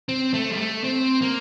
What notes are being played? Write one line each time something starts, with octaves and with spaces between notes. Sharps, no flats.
C4
A3
G3
A3
C4
A#3